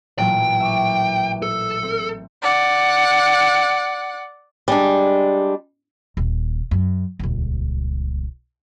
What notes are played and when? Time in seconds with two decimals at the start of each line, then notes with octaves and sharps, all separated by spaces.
0.19 A1 A#2 F#3 G5
0.60 E5 C#6 D6
1.42 A4
1.83 C4
2.42 D5 F#5
4.68 G3 G#3 D4
6.17 D#1
6.71 F#2
7.19 D#1 C#2